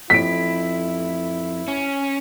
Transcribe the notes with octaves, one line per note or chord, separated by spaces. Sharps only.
A1 F2 E4 B6 D7
C#4